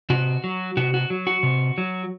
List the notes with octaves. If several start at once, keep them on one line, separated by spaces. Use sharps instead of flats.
C3 F#4
F#3
C3 F#4
F#4
F#3
F#4
C3
F#3